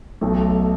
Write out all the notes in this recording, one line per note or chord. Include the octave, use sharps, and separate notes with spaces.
B1 B2 A3